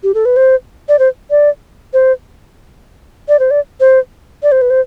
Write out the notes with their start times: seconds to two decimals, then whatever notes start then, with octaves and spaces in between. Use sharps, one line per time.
0.03 G4
0.14 A4
0.25 B4
0.36 C5
0.88 D5
0.99 C5
1.30 D5
1.93 C5
3.28 D5
3.39 C5
3.51 D5
3.80 C5
4.43 D5
4.52 C5
4.61 B4
4.70 C5